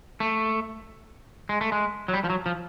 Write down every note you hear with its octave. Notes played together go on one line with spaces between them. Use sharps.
A3
G#3
A3
G#3
F#3
G3
F3
F#3
F3